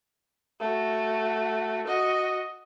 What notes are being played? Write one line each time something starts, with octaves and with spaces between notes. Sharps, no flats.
A3 F#4
F#4 D#5